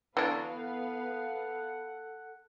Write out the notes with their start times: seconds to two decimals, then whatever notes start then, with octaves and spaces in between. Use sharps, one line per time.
0.17 D3 E3 F#3 B3 D4 B4 F5
0.58 A4 F#5